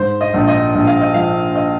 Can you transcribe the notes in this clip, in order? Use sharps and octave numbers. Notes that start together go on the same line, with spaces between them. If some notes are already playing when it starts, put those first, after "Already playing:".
Already playing: G#2 C5
D#5
A#1
D#5
A#1
F5
D#5
F3 F5
D#5